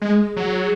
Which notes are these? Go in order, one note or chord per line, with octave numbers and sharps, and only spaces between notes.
G#3 G#4
F#3